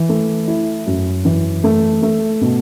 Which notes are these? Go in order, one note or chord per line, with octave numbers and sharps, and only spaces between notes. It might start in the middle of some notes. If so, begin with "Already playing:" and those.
Already playing: E3
A3
E4
F#2
E3
A3
A3
B2